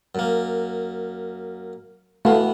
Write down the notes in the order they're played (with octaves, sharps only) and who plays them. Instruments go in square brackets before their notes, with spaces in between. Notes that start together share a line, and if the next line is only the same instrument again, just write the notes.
[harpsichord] F#2 A#3
[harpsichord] E3 B3 [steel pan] A3 F#4 F5